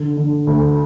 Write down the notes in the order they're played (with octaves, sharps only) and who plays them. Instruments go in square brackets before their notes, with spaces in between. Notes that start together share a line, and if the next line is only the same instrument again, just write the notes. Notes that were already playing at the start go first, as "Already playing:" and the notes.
Already playing: [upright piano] D3
D3
D2